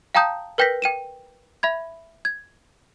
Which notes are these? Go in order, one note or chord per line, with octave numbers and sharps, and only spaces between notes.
F5 G5 A5 A#5 D#6 G6
A#4 B4 G5 G6 A#6 B6
G5 D#7 E7
E5 B5 G#6
G#6